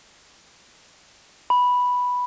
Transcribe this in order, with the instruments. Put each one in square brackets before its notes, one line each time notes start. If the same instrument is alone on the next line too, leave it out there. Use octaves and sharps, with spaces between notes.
[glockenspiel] B5